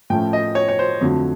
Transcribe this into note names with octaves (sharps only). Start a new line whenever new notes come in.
A2 F3 A3 C#4 G5
D#5
C#5
C#5
C5
F2 D3 F#3 A3